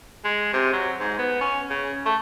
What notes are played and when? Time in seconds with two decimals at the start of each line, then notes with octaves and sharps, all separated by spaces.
0.24 G#3
0.53 C3
0.73 F#3
1.00 G#2
1.18 B3
1.41 C#4
1.70 C#3
2.06 A3